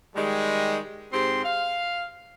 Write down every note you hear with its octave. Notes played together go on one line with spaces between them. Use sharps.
D#3 G3 G#3
G#2 C4 G4 C6
F5